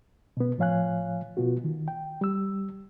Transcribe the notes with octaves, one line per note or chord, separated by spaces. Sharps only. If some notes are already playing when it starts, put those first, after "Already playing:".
B2 B3
A2 F3 C#5 F5 G#5 F#6
B2 B3 F4 F#4
D#3
G5
G3 E6